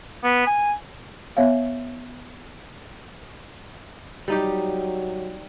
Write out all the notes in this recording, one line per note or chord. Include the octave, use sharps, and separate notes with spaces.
B3
G#5
B3 C#5 E5 F5
F#3 G3 D#4 G4